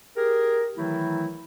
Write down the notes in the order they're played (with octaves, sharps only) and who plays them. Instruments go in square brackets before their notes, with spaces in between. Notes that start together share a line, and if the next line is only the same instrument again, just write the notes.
[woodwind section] G4 G#4 A#4
D#3 E3 F#3 A3 E4